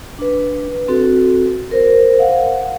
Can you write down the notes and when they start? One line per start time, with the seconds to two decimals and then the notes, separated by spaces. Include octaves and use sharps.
0.19 D4 B4
0.88 C4 F#4 A4
1.71 A#4 C5
2.19 F5 F#5